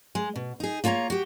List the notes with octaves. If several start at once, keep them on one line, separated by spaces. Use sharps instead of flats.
G#3
B2
D#4 G#4
A#3 F4 C#5 G#5 A#5
F#4 G4